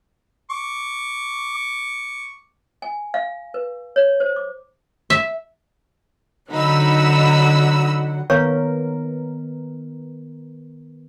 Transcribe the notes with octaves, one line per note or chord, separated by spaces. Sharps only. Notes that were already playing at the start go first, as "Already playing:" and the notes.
C#6 D6
G#5
F5
B4
C#5
C5
D6
E5
D3 F#3 D#4 F#5 B5 E6
D#3 B3 A#4 C#5 F5 C#6